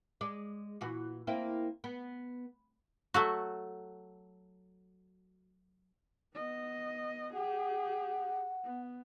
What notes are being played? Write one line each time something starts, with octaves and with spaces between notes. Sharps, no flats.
G#3 D5
A#2 E3 F#4
A#3 C4 E4
B3
F#3 A3 F#4
B3 D#5
G4 G#4 F#5
B3